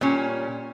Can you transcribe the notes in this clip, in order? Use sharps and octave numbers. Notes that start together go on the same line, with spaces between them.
A#2 G3 C#4